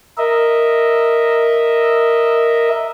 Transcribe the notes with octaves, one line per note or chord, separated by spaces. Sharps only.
A#4 D#5 E5